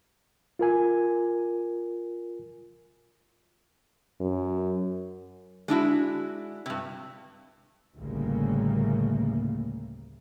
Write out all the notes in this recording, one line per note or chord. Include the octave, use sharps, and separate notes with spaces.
F4 A#4 G#5
F#2
G#3 D4 E4 F#4
G2 C3
A1 D2 A2 C#3 G3 A#3